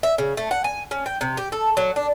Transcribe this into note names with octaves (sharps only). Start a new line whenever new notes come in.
E5
C#3
A3
F#5
G#5
C#4
G5
C3
G4
A4
F#3
D4